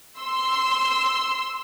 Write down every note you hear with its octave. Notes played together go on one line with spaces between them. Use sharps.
C6 E6